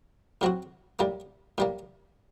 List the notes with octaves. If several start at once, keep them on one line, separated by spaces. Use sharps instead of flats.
A2 F#3 C4 F#4
A2 G3 A#3
A2 G3 A#3